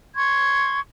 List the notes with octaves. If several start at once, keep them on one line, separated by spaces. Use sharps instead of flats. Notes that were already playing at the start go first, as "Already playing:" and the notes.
C6 C#6 G#6